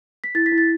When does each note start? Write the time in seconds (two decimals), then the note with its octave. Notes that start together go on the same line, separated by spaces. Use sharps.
0.24 B6
0.35 E4 A6
0.46 B6
0.52 E4
0.58 A6